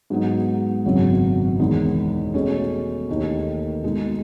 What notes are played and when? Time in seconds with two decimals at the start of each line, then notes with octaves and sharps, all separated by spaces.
0.10 G#2 F#3 B3 D#4
0.85 G#1 F#2 C#3 F#3 B3
1.59 E1 E2 D#3 G#3 D#4
2.34 B2 A3 C#4 G#4 C#5
3.09 D#2 D#3 A3
3.83 B2 G#3 D#4 G#4